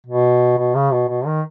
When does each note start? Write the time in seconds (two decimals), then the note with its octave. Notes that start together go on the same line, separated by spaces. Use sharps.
0.06 B2
0.58 B2
0.75 C#3
0.92 B2
1.09 B2
1.26 D#3